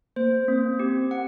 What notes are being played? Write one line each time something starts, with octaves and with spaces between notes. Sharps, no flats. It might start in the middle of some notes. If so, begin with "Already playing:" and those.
A#3 C5
A#3 C4
C4 G4
F#5